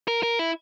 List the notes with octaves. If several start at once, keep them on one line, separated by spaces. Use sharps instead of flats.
A#4
A#4
E4